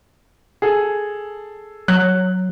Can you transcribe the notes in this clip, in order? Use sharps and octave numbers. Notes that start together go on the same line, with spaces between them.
G#4 A4
F#3 F#6